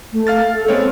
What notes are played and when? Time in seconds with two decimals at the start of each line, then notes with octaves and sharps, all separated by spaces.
0.13 A3
0.27 F5 F6 A6
0.54 A4
0.68 G#3 B3 C4 C#5